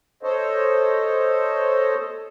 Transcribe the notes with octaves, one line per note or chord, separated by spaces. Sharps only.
A4 C5 C#5 D#5